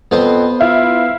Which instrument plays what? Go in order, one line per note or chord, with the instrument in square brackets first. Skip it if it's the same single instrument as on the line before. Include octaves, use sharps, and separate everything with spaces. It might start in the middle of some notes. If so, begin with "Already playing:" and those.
[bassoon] F2 [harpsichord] B3 C5
[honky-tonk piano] E4 [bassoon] F4 [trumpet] F5